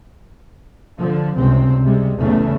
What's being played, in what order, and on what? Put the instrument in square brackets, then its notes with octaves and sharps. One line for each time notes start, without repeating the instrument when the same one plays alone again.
[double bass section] D3 F3
C#2 G2 C3 C4
C3 G3 G#3
F#1 E2 A2 C#3 A3